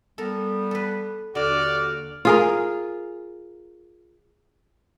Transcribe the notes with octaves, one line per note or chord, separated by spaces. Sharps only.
G3 B3 A4 A#4
A4 B4
D#2 D3 F#4 D5 F6
F4 G#4 A#4